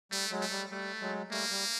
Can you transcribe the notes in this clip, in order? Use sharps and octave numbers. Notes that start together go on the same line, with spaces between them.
G3 A3
F#3 G#3
A3
G3
G3 A3
F#3 G#3
G3 A3 A#3
G3